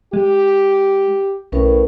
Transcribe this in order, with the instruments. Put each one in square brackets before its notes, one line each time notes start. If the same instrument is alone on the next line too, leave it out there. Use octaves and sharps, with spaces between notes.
[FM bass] G#3 [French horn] G4
[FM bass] B1 [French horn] A2 [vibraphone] C#4 A#4 B4